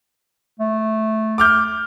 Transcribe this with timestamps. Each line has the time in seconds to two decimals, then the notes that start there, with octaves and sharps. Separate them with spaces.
0.60 A3
1.38 D6 F6 G6